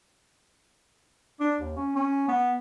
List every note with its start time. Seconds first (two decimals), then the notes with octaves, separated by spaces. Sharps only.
1.40 D4
1.60 D#2
1.77 C#4
1.96 C#4
2.28 B3